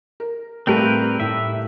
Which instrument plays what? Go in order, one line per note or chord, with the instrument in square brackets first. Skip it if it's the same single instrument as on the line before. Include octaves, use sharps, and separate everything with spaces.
[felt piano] A#4
[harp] A2 [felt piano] G3 A3 A#3 [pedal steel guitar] C4 A#4 B4
[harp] A2 E4 [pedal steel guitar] E5